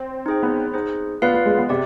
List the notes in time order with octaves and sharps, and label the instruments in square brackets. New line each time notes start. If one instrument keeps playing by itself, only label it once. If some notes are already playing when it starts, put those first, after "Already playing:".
Already playing: [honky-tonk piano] C4
[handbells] D#4 G#4 C5 G5
[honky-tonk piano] B3
[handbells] D#4 G#4 C5
[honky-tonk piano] B3 [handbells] F4 B4 D5 F5
[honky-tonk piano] B3
G#3
B3
[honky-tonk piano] C3 [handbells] G4 D5